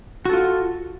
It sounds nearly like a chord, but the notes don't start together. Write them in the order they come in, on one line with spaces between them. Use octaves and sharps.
F#4 A4 F4